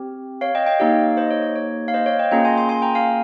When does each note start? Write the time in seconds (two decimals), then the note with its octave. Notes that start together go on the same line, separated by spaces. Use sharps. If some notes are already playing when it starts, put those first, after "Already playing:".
Already playing: C4 G4
0.41 C#5 F5
0.55 D#5 G5
0.66 D#5 G5
0.80 A#3 D#4 G4 C#5 F5
1.17 C5 D#5
1.30 C#5
1.42 C#5
1.56 C#5
1.88 F5
1.94 C5 D#5
2.06 C#5 F5
2.19 D#5 G5
2.31 A#3 C#4 F4 G#4 G5 A#5
2.45 G#5 C6
2.58 G#5 C6
2.69 G#5 C6
2.82 G5 A#5
2.95 F5 G#5